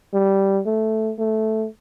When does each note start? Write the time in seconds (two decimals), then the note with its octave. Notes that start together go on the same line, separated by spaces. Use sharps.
0.14 G3
0.66 A3
1.19 A3